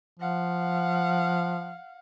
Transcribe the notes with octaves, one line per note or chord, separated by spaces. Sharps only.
F3 F5 F#5